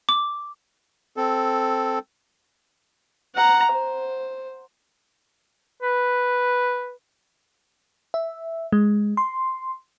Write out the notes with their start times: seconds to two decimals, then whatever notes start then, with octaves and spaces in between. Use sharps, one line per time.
0.09 D6
1.17 C4 A4
3.35 F#5 A#5
3.72 C5
5.82 B4
8.14 E5
8.72 G#3
9.17 C6